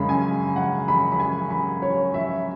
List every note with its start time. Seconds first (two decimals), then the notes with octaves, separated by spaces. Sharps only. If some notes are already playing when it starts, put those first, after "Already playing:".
Already playing: F#2 C#3 G#3 C#4 B5
0.09 G#5
0.56 F#5
0.88 B5
1.12 B5
1.20 G#5
1.50 B5
1.82 C#5
2.14 E5